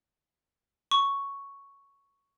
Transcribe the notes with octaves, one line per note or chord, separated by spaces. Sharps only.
C#6